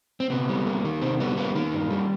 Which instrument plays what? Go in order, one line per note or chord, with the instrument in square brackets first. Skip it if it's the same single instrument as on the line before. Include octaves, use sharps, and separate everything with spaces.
[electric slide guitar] C4
C3 B3
G3
A#3
D#3
C3 C4
G3 B3
A#3 B3
D#3 A#3
G2
G3